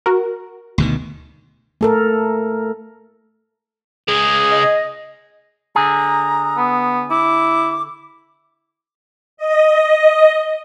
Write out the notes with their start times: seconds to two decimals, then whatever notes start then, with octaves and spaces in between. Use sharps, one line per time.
0.06 F#4 A#4
0.78 D2 B2 D#3
1.81 A3 A4 A#4
4.08 C#3 G#3 G#4
4.51 D#5
5.76 D3 G#4 A#5
6.57 B3
7.10 E4 D6
9.37 D#5